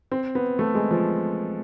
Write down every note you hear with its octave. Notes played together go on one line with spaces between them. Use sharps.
C4
B3
A3
G#3
F3